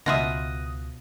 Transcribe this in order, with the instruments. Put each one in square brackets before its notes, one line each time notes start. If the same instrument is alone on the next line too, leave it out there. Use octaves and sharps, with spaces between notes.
[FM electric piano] C#2 [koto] B2 F4 E5 [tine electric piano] D#6 F#6 A#6